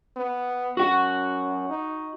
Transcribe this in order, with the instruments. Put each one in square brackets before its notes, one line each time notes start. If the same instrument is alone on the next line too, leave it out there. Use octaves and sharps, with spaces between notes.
[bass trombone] B3
[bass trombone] F#2 [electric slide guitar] F#4 F#5
[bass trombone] D#4